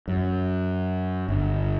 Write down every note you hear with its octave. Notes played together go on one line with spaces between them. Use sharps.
F#2
G1